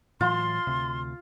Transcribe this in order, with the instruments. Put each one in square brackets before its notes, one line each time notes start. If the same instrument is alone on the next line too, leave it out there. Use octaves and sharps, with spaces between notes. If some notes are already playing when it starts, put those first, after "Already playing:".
[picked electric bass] A2 E3 F#3 [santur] F4 [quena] C6
[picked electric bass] D2 C3